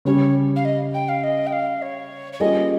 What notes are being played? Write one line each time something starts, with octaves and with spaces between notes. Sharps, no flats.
C#3 G3 C#4 G4 C#5
F5
D#5
G5
F5
D#5
G5
F5
C#5
C#5
G3 A#3 C#4 F4 G#4 D#5